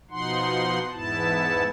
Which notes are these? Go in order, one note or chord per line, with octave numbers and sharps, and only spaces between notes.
B2 F3 D#4 F#5 C6
E2 G#2 B3 E4 A5